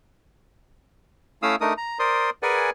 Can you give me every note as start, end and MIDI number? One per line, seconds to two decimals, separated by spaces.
1.43 1.56 57
1.43 1.56 61
1.43 1.56 64
1.43 1.56 77
1.43 1.56 87
1.43 1.56 88
1.61 1.73 57
1.61 1.73 62
1.61 1.73 63
1.61 1.73 70
1.61 1.73 87
1.78 1.98 82
1.99 2.30 70
1.99 2.30 72
1.99 2.30 74
1.99 2.30 84
1.99 2.30 87
2.43 2.70 68
2.43 2.70 70
2.43 2.70 71
2.43 2.70 74
2.43 2.70 78
2.43 2.70 80